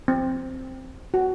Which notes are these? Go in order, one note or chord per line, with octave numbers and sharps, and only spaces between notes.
C4
F#4